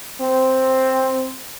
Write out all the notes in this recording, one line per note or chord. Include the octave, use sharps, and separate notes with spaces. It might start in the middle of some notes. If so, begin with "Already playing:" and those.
C4